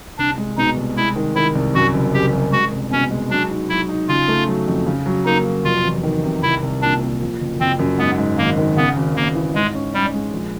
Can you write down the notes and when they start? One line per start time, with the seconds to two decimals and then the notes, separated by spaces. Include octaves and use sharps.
0.18 C2 D4
0.38 G#3
0.58 B2 D#4
0.77 C2
0.96 G#3 E4
1.16 D#3
1.35 D#3 E4
1.55 C2
1.75 F#2 F#4
1.94 F#1
2.13 F#1 G4
2.33 F#2
2.52 G#3 F#4
2.72 C2
2.91 B2 C#4
3.11 G#3
3.31 F#3 D4
3.50 D#4
3.69 F#3 E4
3.89 D#4
4.08 C#3 F4
4.28 A3
4.48 F#3
4.67 F2
4.86 C#3
5.06 F#3
5.25 A#3 D#4
5.45 F#3
5.64 F1 F4
5.84 E2
6.03 D#3
6.23 C3
6.43 C2 E4
6.63 C2
6.82 A#2 D4
7.01 A#2
7.21 F3
7.40 F#1
7.60 F#1 C4
7.79 F#2
7.99 G#2 B3
8.18 G#2
8.37 G#1 A#3
8.57 D#3
8.77 C#3 B3
8.96 G#1
9.16 C#3 A#3
9.35 E3
9.55 G#2 G#3
9.75 C#4
9.94 G3 C#4
10.14 G#3
10.33 A#1